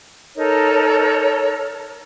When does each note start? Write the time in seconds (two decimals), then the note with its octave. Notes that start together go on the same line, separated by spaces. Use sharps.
0.36 D#4 A4 A#4 C#5